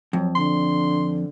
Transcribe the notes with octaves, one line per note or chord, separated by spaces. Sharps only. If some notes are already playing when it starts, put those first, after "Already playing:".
F2 F#3
D3 C6